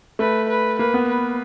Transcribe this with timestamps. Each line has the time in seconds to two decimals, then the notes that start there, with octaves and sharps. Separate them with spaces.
0.19 A3 B4
0.49 B4
0.79 A#3 B4
0.94 B3
1.08 B4